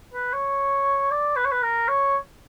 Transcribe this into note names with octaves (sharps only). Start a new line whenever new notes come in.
B4
C#5
D5
B4
C#5
B4
A#4
C#5